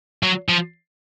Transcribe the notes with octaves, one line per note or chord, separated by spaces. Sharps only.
F#3
F3